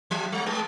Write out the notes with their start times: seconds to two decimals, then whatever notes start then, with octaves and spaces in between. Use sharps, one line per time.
0.11 F#3
0.32 G3
0.46 G#3